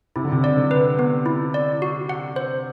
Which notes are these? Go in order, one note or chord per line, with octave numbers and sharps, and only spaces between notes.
C3 E4
D3
C3
D5
D3
B4
B3
E4
D5
F#4
F#5
C5